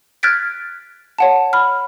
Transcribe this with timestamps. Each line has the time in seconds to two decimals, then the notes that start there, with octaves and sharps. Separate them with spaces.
0.23 F6 F#6 G#6 A6 B6 D7
1.18 C#5 F#5 A5
1.53 B5 F6